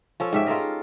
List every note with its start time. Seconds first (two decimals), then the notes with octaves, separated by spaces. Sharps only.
0.20 F3 C#4 A4
0.33 G#2 G4 E5
0.46 F4 A4 A#4 D#5